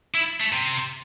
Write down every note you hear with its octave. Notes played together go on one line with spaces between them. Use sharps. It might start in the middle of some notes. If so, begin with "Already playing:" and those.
E4
A3
C3